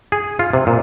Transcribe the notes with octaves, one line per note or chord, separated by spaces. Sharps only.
G#4
F4
C3
A#2